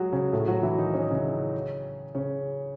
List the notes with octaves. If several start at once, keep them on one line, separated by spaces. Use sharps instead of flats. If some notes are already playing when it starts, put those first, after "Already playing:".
Already playing: F#3 G#3 F#4 G#4
C#3 C#4
A2 A3
F#3 F#4
E3 E4
D#3 D#4
C#4
D#4
C#3 C#4
C#3 C#4